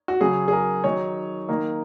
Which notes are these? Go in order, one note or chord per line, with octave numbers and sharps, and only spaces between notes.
F#4
C#3 F#3 C#4 G#4
G#4
A#4
D#3 F#3 D#4 C#5
D#3 A#3 D#4